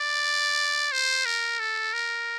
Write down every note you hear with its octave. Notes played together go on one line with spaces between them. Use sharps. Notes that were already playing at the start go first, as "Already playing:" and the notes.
Already playing: D5
C5
A#4
A4
A#4